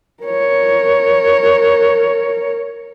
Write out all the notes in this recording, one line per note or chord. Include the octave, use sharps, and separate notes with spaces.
A#4 C#5